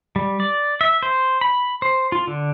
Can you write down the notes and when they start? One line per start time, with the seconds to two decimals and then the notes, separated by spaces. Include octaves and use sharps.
0.16 G3
0.40 D5
0.81 E5
1.03 C5
1.41 B5
1.82 C5
2.12 F4
2.27 D3